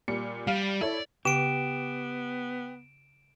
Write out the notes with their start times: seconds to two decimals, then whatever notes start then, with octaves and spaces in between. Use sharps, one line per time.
0.08 A#2 G3 C#7
0.47 G3 F5
0.81 E4 A4 C#5 D5
1.25 C#3 B3 G4 D7 E7